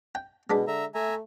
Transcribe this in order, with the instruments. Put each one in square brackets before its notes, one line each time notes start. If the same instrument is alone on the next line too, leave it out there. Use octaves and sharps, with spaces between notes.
[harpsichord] G5
[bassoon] B2 [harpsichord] G#3 D4 B5
[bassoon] D3 [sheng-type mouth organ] E5 A#5
[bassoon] A3 [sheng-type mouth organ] E5 G#5 A#5